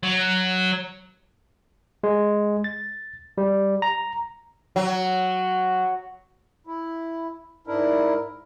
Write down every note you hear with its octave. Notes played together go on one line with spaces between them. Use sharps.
F#3
G#3
A6
G3
A#5
F#3
E4
G#2 D4 E4 A#4